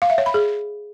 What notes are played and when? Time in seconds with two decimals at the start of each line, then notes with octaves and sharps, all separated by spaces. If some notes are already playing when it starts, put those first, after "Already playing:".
0.02 F5
0.10 E5
0.18 C#5
0.26 B5
0.34 G#4